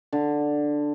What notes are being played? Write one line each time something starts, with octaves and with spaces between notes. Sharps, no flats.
D3